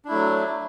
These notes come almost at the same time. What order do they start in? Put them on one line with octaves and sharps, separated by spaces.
D4 E4 A3 F#3